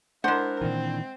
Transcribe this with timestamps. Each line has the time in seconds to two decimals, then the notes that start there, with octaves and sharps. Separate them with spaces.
0.24 G#3 D4 E4 A#4 C5 F#5
0.62 A#2 D#3 E3 C4